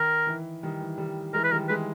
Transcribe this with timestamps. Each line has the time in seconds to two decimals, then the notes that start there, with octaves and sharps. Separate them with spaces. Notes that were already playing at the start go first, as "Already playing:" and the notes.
Already playing: D#3 A#4
0.27 E3
0.63 D#3 G3
0.81 E3
0.98 D#3 G3
1.33 E3 G#3 A#4
1.44 B4
1.51 D#3 G3 A#4
1.69 E3 G#3 B4